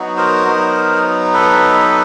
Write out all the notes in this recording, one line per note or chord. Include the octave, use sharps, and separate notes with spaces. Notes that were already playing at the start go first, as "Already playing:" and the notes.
Already playing: F#3 B3 D#4 F#4
A#4 C5
F#3 B3 D#4
A4 B4